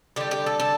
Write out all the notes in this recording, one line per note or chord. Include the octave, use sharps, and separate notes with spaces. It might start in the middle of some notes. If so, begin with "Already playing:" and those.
D3 G3 G4
G4
A4
A4